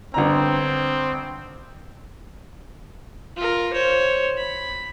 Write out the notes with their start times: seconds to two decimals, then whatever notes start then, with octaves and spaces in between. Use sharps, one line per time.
0.14 G1 D3 C4 A#5
3.36 F4 A#4
3.73 C5 C#5
4.37 B5